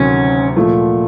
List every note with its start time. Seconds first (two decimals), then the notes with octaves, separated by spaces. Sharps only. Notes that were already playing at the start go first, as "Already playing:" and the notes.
Already playing: D2 C3 D#3 F#3 C#4
0.56 A#2 F3 A3